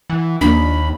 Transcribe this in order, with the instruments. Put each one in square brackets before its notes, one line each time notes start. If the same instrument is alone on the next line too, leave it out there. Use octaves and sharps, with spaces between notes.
[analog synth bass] E3 [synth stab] F#5
[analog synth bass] D#2 [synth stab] F3 A#3 D4 [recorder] B5